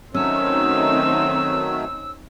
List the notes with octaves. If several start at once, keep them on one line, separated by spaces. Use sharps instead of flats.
D#3 F#3 A3 C4 C#4 D#4 E6